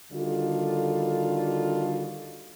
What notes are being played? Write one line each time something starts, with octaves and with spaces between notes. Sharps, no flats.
D3 D#3 G3 F4 F#4 A4